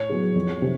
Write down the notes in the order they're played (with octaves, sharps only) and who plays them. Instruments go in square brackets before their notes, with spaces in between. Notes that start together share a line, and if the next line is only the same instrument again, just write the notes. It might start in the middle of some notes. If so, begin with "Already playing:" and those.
Already playing: [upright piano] A2 [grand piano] C#5
[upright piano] F#3 B3 E4 G#4
F2
C3